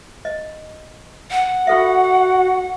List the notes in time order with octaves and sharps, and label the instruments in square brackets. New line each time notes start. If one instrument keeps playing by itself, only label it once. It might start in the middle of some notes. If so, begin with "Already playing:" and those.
[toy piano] D#5
[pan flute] F#5
[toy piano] F4 A4 E5 [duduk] F#4